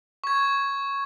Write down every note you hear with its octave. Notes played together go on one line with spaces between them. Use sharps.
C#6 G#6